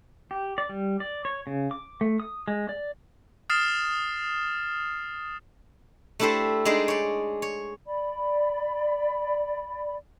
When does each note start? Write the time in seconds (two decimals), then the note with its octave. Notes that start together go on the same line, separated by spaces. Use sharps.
0.31 G4
0.58 D5
0.69 G3
1.00 D5
1.25 C#5
1.47 C#3
1.71 D6
2.01 A3
2.20 D#6
2.48 G#3
2.69 D5
3.50 D#6 F6 A6 C7 E7
6.20 A3 D4 E4 G4 A4 C5
6.65 G#3 D4 D#4 G#4 C5 D5
6.88 C#5 D5
7.42 C#5
7.86 D5 B5